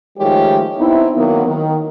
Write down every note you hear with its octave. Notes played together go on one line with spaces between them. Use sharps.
D#3 F3 G#3 A3 G4 C#5
B3 C4 D#4 E4
D#3 F#3 A#3 B3
D#3